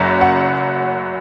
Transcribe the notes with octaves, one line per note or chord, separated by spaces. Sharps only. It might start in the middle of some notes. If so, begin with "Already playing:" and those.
Already playing: F#1 F#2 F#3 A#5
F#5